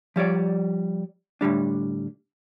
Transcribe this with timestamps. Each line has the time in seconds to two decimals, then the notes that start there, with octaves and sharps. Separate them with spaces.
0.16 F3 G3 C#5 D5
1.41 A2 D3 G3 D4